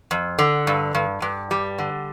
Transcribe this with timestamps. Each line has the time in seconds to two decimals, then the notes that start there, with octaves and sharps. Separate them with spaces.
0.11 F2
0.39 D3
0.67 G2
0.95 G2
1.22 G2
1.51 G3
1.78 D3